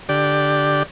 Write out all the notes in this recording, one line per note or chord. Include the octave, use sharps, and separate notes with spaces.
D3 G4 D5